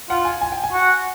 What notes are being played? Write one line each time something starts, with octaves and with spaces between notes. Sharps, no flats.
F4 F#5
G#5
G#5
G5
G#5
F#4